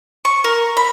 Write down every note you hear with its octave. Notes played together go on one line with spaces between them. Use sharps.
C#6
A#4
B5